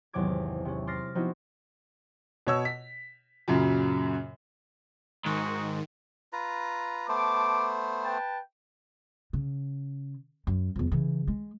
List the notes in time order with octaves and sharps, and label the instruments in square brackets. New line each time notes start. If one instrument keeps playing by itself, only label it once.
[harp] G#1 E2 C3 F#3 D6 G#6
C3 C#4
C6 D6 F6 A6 A#6 C7
F3 B3 C4 D#4 E4 F#4
[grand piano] B2 C#5 E6
B6
F#2 A#2 C#3 F#3
[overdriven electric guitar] G#2 [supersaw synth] D#3 [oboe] F#4
[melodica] F4 B4 A#5
[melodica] A3 B3 C5 [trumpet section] A5 D6
[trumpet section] B4 G5 A5
[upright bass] C#3
F#2
E2 F3
C#3 E3
G#3